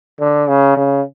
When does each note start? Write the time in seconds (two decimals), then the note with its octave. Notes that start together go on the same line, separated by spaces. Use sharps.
0.20 D3
0.48 C#3
0.77 C#3